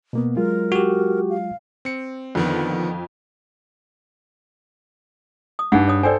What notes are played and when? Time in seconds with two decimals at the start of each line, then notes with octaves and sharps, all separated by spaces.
0.13 B2 A#3 B3
0.36 F#3 G#3 F4 A#4
0.72 F#4 G4
1.30 F5
1.85 C4 C#7
2.35 F2 D3 D#3 B3
5.59 D#6
5.72 G2 D#4 G#4 F#5
5.88 C#5 D#6
6.03 A4 C5 D5 G5 G#5